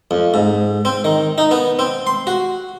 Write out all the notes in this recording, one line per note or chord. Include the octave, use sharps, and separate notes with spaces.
F2
G#2
C4
D#3
D#4
B3
C4
C6
F#4